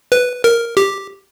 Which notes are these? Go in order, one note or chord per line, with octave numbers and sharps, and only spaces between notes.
B4
A#4
G4